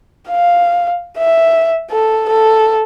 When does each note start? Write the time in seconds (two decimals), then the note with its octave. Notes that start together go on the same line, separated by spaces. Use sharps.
0.29 F5
1.18 E5
1.91 A4
2.29 A4